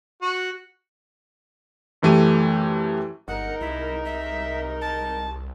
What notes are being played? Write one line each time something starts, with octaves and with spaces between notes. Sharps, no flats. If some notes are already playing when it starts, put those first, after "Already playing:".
F#4
F#2 E3 A3 G4 D#7
G1 G#3 D#4 A#4 F#5
C2 E4
E5
A5